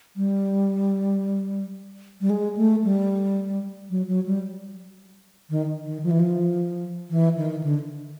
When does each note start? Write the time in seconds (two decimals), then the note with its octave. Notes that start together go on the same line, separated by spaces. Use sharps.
0.16 G3
2.21 G3
2.30 G#3
2.57 A3
2.84 G3
3.90 F#3
4.08 F#3
4.26 G3
5.50 D#3
5.86 D#3
6.03 F3
6.11 E3
6.20 F3
7.10 E3
7.37 D#3
7.63 D3